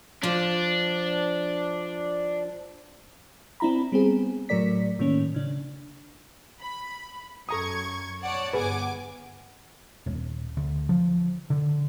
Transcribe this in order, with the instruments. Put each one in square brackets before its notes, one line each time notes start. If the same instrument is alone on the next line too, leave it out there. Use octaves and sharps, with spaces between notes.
[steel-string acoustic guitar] F3 [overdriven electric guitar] D4
[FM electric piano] C4 D4 E4 A#5 B5
G3 B3 C4 G#4
A2 F#3 A3 A#4 D5 B6
A2 D#3 A3 A#3 C#4
C#3 D4
[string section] B5
[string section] F#2 C#6 G#6 [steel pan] A4 A#5 D#6
[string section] C#5 D5 A5 [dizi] F#5
[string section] G1 G#5 D6 [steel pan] G#4 B4
[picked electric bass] D#1
D2
F3
D3